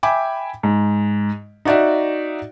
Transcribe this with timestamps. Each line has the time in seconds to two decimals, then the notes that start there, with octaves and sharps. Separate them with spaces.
0.03 E5 G5 G#5 B5 D6
0.63 G#2
1.65 D#4 F#4 D5 E5 F#5